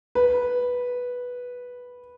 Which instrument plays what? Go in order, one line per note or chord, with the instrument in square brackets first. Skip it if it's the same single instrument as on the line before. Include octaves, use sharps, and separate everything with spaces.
[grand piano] B4